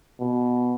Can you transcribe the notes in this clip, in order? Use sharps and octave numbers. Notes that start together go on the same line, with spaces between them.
B2